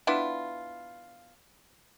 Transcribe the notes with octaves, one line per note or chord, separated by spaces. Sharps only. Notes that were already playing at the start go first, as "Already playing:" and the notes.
B3 D4 E4 F4